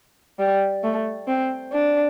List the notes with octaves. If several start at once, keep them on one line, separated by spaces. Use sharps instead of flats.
G3
A3
C4
D4